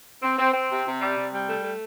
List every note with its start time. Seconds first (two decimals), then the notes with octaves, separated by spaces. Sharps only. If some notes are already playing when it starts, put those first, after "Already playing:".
0.23 C4
0.39 C4
0.54 C4
0.70 C3
0.86 C3
1.01 G3
1.17 C3
1.32 G3
1.48 A3
1.64 A3